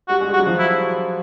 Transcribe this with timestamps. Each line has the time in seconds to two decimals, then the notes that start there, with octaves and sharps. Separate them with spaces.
0.09 G3 F#4
0.21 G#3
0.29 G3
0.33 F#4
0.38 F#3
0.46 F3
0.59 E4